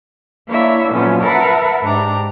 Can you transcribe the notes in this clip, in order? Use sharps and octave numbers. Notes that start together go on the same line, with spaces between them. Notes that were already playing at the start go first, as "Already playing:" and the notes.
A#3 D4 E4 C#5 E5
A#2 D3 F3 F#3 B3 C#4
A#4 B4 E5 F#5 A5 B5
G#2 D4 G4 A#5